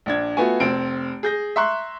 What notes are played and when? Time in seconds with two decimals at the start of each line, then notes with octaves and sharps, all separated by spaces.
0.06 A#1 D4 G#6
0.37 A3 B3 F4 F#4 G#5
0.60 F1 C4 D7
1.23 G#4 G6 A#6
1.56 E5 A#5 C6 C#6 F#6